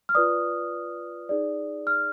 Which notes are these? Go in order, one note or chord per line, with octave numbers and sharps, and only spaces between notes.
F6
F4 B4 D5 D#6
D#4 G#4 D5
F6